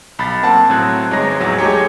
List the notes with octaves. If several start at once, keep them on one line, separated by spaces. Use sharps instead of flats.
B1 B5 A6
A#3 C4 F#5 A5
A2 F#3 C4 F#6 G#6
G1 G#3 D#4 C#5 A#5 A#6
A1 E2 F#3
G#3 A3 D#4 G4 G#4 C#5